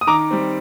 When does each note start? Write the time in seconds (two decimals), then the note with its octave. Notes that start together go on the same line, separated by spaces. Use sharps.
0.01 D#6
0.07 D#3 A#5 D6
0.31 G3 C4